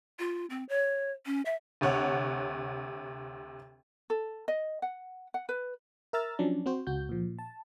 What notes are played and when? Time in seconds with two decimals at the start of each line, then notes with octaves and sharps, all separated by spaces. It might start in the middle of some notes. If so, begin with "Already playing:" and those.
0.19 F4
0.50 C4
0.69 C#5
1.26 C#4
1.45 E5
1.81 D2 C3 C#5 F#5
4.10 A4
4.48 D#5
4.82 F#5
5.34 F#5
5.49 B4
6.13 A#4 E5 A#5 E6 F6 A6
6.39 F3 F#3 C#4 D4
6.66 C4 F#4 C5
6.87 C#2 F#4 G6
7.09 A#2 F3
7.39 A5